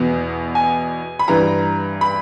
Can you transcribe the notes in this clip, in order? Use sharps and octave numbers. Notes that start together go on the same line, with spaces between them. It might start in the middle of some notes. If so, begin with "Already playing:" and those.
Already playing: E2 B2
G#5
B5
G2 E3 A#5
B5